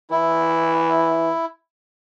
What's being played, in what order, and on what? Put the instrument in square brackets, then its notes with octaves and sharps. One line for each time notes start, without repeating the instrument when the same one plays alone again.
[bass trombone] E3 [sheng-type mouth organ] E4